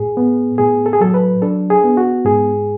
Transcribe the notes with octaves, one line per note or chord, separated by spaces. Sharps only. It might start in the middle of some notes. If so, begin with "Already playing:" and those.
Already playing: A2 G#4
B3
A2 G#4
A4
G#4
F#3 A4
B4
D4 A4
G#4
B3
F#4
G#2 G#4